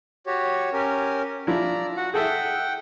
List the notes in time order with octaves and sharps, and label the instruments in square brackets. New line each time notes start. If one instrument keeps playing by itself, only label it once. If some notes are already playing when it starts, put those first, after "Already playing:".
[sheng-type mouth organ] F#4 G4 C#5
C#4 G4 A#4
[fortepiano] F3 E4 [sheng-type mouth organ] D5 A#5
[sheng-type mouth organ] F#4 F#5
[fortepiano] G#4 A4 E5 [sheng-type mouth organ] F#5 G5